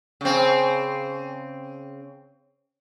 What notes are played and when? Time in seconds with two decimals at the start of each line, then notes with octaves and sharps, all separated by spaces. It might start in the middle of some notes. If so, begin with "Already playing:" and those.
0.21 C#3 C4